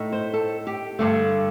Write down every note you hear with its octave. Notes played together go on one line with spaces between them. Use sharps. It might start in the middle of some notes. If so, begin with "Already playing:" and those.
Already playing: A2 A3 D#4
C5
A4
G4
G2 D3 A3